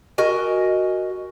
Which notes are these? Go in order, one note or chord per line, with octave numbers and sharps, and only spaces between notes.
F#4 A#4 D#5 G#5